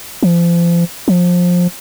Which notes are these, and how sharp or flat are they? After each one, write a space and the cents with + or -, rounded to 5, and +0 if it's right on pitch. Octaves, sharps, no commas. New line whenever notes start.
F3 -35
F3 +20